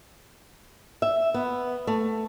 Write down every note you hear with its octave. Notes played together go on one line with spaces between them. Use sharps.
E5
B3
A3